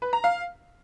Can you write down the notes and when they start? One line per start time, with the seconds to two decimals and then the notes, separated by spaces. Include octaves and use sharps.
0.02 B4
0.13 A#5
0.24 F5